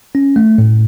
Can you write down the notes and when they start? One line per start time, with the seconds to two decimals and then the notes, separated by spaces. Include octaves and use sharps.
0.15 C#4
0.36 A3
0.58 A2